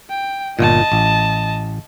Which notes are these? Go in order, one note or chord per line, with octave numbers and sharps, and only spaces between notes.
G5
G1 A#2 D#5 A5
A1